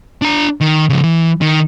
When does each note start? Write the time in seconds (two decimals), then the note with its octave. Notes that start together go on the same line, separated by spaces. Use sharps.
0.22 D4 A#5
0.61 D#3
0.89 C#3 F3
1.04 E3
1.41 D#3